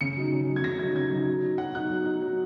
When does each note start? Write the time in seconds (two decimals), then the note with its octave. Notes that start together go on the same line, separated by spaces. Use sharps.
0.01 C#3 C#7
0.16 F#3 D#4
0.33 C#3
0.49 F#3 D#4
0.56 G#6
0.64 C#3 A#6
0.79 F#3 D#4 G#6
0.95 C#3 G#6
1.11 F#3 D#4
1.26 F#3
1.43 D#4
1.58 F#3 F#5
1.75 D#4 F#6
1.91 F#3
2.05 D#4
2.22 F#3